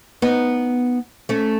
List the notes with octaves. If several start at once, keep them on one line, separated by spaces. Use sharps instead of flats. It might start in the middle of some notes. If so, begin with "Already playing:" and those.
B3 D#4
A3 C#4